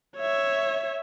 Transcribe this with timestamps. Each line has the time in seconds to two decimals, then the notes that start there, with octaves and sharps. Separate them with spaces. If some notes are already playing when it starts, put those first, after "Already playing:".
0.17 C#5 E5